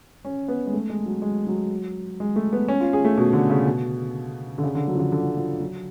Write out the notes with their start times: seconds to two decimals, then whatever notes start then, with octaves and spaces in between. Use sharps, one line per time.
0.25 C#4
0.48 B3
0.66 G#3
0.73 A3
0.90 G#3
1.06 F#3
1.22 G#3
1.47 F#3
2.20 G#3
2.36 A3
2.53 B3
2.68 C#4
2.80 F4
2.93 G#4
3.05 A3
3.17 B2
3.33 D3
3.50 C#3
3.66 B2
4.58 D3
4.63 C#3
4.75 D3
4.88 F#3
4.95 F3
4.99 D3
5.12 D3
5.24 F#3
5.37 F3
5.60 F#3